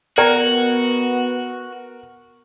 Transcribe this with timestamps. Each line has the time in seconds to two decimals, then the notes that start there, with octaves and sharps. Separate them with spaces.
0.18 B3 F#4 A#4 D5 G5